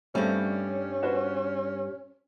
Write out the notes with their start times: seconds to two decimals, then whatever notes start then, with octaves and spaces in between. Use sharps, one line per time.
0.15 G2 G3 A3 C4 C#4
1.03 F#4 B4 C5